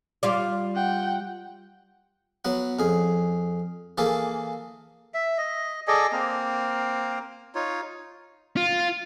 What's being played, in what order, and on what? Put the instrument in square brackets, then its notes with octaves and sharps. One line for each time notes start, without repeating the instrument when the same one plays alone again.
[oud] G3 F4 D5
[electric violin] F#5 G5
[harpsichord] F#3 B3 F#5
F2 G#4
E3 A#3 G#4 A4
[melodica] E5
D#5
G#4 A4 D5 D#5
A#3 C4
D#4 F4 C#5
[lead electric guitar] F4